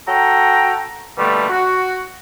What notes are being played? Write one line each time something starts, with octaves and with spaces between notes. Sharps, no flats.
F#4 A4 G5 A#5
B2 D3 G3 A3 A#3
F#4